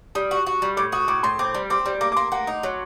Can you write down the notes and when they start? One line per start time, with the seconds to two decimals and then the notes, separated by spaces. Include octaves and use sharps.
0.15 G3 D#6
0.31 F#4
0.46 F#4
0.62 G3
0.77 A2 D6
0.92 F#4 D#6
1.08 A2 D6
1.23 A2 C6
1.39 C4 D6
1.54 G3
1.70 C4 D6
1.86 G3
2.01 A#3 D6
2.12 D6
2.16 A#3 C6
2.32 A#3 F#5
2.47 D#4
2.63 F#3